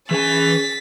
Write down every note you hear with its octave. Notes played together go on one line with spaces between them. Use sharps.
E3 C#4 G#4 G#5 A6 B6